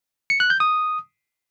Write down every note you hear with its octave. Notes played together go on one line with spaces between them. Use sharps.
C#7
F#6
G6
D#6